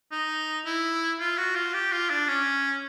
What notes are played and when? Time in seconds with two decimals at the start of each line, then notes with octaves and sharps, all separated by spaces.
0.12 D#4
0.66 E4
1.20 F4
1.38 F#4
1.56 F4
1.74 G4
1.92 F4
2.10 D4
2.28 C#4